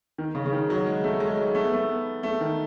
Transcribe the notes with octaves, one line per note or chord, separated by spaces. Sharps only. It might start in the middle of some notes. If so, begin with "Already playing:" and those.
D#3
C#3
C#3
D#3
F#3
G#3
A3
G#3
F#3
A3
B3
A3
B3
A3
D#3